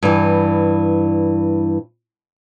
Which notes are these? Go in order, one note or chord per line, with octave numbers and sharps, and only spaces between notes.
G2 E3